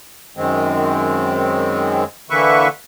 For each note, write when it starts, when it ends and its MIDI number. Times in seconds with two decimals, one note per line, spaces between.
0.37 2.04 42
0.37 2.04 51
0.37 2.04 56
0.37 2.04 60
2.30 2.68 50
2.30 2.68 52
2.30 2.68 58
2.30 2.68 71
2.30 2.68 76
2.30 2.68 85